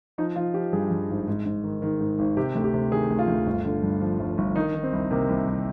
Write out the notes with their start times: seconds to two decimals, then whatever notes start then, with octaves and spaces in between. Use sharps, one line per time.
0.18 F3 D#4
0.36 F3 F4
0.54 F3 G4
0.73 G2 G#4
0.91 G2
1.09 G#1
1.28 G#2
1.46 G#2
1.64 D#3
1.82 D#3
2.01 G#2
2.19 G#1
2.37 C3 G4
2.55 D2
2.64 G4
2.74 C3
2.91 D#3 G#4
3.10 D2
3.19 F4
3.28 D2
3.47 G1
3.65 D3
3.83 G2
4.01 F3
4.20 G1
4.38 G1
4.56 D#3 D#4
4.74 D#3
4.83 C4
4.93 C2
5.11 C3 A#3
5.29 C2
5.47 C2